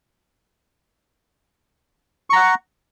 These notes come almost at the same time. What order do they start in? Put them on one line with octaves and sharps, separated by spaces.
C#6 A#5 F#5